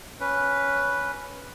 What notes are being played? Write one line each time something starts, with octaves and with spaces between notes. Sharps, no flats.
C#4 B4